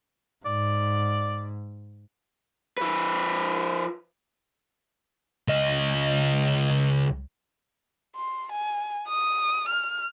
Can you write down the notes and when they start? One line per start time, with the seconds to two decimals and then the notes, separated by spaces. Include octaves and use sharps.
0.46 G#2 D5
2.78 F3 B4
5.48 C#2 D#5
8.16 C6
8.52 G#5
9.08 D#6
9.68 F6